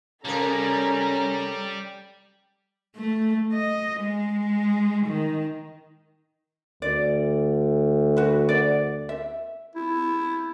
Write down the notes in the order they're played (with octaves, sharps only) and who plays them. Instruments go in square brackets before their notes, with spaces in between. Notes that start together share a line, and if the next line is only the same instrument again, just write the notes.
[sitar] C3 A#4 [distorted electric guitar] G3 [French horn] C#4 [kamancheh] A4 A#5
[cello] A3
D#5
G#3
D#3
[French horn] D2 [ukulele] D5
[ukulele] F#4 B4
D5
E5
[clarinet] E4